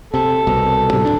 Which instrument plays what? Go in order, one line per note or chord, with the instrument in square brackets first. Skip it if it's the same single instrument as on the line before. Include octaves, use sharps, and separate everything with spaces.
[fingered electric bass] C3 [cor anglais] A4
[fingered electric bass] C2 B2
A2 C3 G3
D#1 C#2 D4